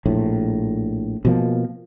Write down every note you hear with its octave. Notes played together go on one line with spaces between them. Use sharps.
A#1 A2
B2 F3 A#3